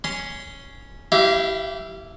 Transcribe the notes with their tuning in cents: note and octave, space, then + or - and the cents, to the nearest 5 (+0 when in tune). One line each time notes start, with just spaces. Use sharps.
C#4 +0 C6 -25
E4 +0 G4 -25 F5 -35